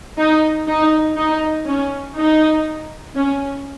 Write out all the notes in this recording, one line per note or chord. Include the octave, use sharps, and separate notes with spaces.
D#4
D#4
D#4
C#4
D#4
C#4